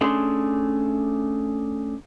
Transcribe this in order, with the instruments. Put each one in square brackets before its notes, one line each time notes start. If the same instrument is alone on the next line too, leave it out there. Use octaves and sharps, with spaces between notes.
[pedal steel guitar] A3 C#4 D4 G#4 C6